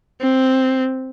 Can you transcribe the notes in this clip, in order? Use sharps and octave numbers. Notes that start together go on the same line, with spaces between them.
C4